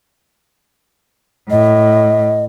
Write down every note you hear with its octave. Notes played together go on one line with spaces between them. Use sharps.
A2 D#5